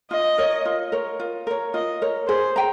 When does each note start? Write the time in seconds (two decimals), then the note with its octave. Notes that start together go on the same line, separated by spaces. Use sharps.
0.11 F4 D#5
0.38 A#4 C#5
0.65 F4
0.92 A#4 C#5
1.20 F4
1.47 A#4 C#5
1.74 F4 D#5
2.02 A#4 C#5
2.28 G#4 C5
2.56 G5 A#5